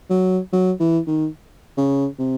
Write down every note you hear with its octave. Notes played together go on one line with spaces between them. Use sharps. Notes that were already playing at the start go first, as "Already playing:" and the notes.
F#3
F#3
E3
D#3
C#3
C3